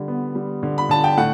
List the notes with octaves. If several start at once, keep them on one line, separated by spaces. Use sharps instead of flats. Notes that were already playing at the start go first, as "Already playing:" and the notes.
Already playing: D3 G3
B3
G3
D3
B5
D3 A5
G5
A2 F#5